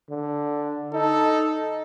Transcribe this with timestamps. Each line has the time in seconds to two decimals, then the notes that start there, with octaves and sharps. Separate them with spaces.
0.10 D3
0.93 D#4 A4